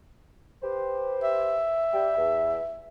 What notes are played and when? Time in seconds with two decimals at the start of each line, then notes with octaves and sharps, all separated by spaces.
0.63 G4 B4 C5
1.23 E5
1.93 G3 G5
2.17 E2